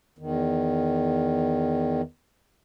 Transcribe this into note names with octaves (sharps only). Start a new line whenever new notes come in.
E2 D#3